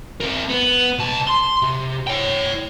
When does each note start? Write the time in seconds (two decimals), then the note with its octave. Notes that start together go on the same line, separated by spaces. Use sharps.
0.21 C4 A#4
0.50 B3
0.98 C2 A5
1.27 C6
1.62 C3
2.07 C#5 G5